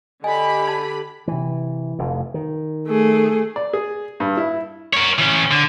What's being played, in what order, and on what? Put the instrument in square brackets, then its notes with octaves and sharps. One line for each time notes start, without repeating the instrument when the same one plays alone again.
[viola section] D3 G4 B5 [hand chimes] D#5 G#5
[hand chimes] A5 G#6
[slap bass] C3 E3
F1 F2
D#3
[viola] A3 G#4
[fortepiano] D5
G#4
G2
E4
[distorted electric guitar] A#4 C#5
E3 C#4
D3